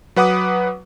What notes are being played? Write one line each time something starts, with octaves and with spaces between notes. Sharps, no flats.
F#3 B4 F#5 D6 D#6